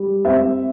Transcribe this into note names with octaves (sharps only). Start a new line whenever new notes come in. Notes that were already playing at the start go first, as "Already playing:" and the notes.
Already playing: G3
C4 E5